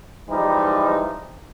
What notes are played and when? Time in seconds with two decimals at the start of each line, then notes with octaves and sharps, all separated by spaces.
0.30 E3 F3 G3 G#3 D#4